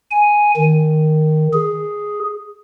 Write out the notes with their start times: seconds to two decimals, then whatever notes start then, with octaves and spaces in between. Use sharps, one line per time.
0.11 G#5
0.56 D#3
1.53 G#4